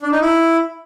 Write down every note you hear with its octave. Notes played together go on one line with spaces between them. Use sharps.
D4
D#4
E4